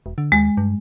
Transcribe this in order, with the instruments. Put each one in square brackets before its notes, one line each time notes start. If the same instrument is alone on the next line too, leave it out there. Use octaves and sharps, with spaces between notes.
[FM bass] E1
D3
[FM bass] D#2 [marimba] G#3
[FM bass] G2